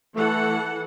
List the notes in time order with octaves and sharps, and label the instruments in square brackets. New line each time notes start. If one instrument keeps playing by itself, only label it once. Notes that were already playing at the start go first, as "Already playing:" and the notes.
[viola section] E3 A4 F#5 [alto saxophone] A3